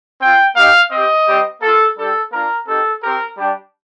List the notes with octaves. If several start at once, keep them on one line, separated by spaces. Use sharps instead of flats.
C4 F4 G5
A#3 D#4 G4 F5
C4 G4 D#5
G3 C4 G4
A#3 F4 A4
G3 D4 G4 A4
A#3 D4 F4 A#4
C4 D#4 G4 A4
C4 G4 A#4
G3 D4 G4